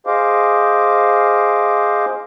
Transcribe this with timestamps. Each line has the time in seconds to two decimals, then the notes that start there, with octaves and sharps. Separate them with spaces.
0.07 G#4 C5 D#5 F5 D6